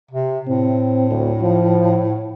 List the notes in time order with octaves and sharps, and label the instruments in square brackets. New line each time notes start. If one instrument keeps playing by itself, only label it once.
[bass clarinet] C3
[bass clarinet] A2 [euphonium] C4
[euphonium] D2
F3